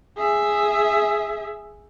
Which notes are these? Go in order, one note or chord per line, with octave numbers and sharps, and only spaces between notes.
G#4 E5